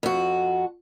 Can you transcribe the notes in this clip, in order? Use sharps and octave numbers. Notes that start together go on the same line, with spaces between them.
F2 F#4